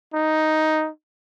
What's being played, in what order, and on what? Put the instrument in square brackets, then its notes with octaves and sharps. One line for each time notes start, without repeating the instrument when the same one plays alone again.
[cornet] D#4